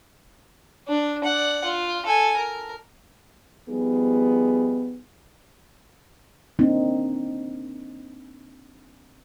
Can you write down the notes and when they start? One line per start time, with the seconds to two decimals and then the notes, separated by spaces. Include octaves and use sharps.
0.88 D4
1.24 D5 F#5
1.65 F4
2.06 A4 G#5
2.37 A#4
3.68 F3 G3 B3 D#4 G#4
6.59 A#3 C4 D4 D#4